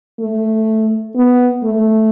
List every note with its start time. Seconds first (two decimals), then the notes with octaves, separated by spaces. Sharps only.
0.20 A3
1.16 B3
1.64 A3